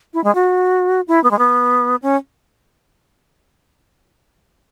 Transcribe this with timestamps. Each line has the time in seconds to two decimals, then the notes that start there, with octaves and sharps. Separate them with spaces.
0.14 E4
0.24 G#3
0.35 F#4
1.08 E4
1.24 B3
1.31 G#3
1.39 B3
2.02 C#4